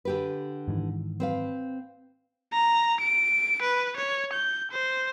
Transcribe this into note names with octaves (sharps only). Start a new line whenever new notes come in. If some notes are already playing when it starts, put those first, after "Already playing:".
D3 G4 B4
G#2 D#3 E3
C4 B4 F5
A#5
D7
B4
C#5
G6
C5